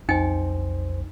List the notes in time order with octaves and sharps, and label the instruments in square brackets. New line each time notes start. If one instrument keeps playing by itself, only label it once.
[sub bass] B1 [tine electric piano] F2 C5 [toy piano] D#4 G5 G#5